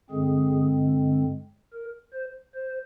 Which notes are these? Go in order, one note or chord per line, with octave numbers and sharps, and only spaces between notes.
G2 D3 G#3 C4 G#4
A#4
C5
C5